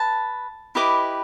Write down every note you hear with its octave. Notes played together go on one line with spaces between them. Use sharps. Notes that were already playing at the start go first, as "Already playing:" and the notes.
Already playing: B4 A5
E4 G4 B4 D#5 D6